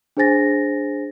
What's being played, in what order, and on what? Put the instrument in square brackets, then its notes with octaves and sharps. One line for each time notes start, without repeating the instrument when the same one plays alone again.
[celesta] D4 G#4 C5 G#5 A6 A#6